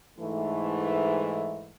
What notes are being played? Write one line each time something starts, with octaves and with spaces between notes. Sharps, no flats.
G#2 E3 A3